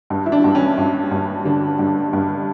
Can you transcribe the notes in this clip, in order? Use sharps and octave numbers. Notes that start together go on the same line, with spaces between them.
G2
E4
D4
G2
C#4
G2
G2
D3 D4
G2
G2